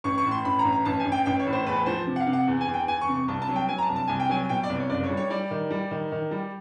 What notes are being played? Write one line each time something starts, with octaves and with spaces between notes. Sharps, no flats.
A1 C#6
C#6
A2
C6
A1 B5
A#5
A1
A#5
A1 A5
G#5
A1
G5
A1 G5
C#5
A2
C5
E2 B4
F3 C5
C3
F#5
F5
C3
F#5
E2
G#5
E2
G5
E2 G#5
C#6
C3
C#6
C2 A5
A5
F#3
G5
F#3 G#5
A#5
A5
C2
A5
C2 G#5
G5
F#3 G#5
B2 G5
D5
C2
C#5
F#1 D5
C#5
G3
C#5
G3 D5
D#3
G3
D#3
D#3
G3